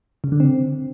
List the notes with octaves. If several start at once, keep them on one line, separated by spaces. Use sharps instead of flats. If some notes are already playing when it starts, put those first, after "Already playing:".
C#3
D3
C4